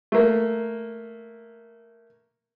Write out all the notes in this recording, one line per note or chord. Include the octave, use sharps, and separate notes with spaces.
A3 A#3